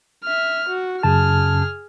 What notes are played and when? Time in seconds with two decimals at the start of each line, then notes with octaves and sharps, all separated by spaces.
0.24 E5 F6
0.69 F#4
1.03 F#2 C#3 G#4 A5 F6